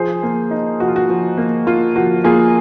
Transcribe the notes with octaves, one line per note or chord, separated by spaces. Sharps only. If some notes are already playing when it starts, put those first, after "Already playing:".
Already playing: F3 G#4 C5
A#3
D#4
F3 F#4
F4
F#4
F3
A#3
A#3 F4
F3 F#4
A#3 F4 G#4